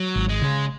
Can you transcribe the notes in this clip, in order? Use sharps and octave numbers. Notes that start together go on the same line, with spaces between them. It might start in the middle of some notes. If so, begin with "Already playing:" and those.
Already playing: F#3
G#1
G#3
C#3